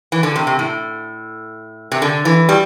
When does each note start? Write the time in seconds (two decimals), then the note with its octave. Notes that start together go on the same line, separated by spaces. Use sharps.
0.12 E3
0.23 D3
0.36 C3
0.47 C3
0.59 A2
1.92 C3
2.02 D3
2.25 E3
2.49 G3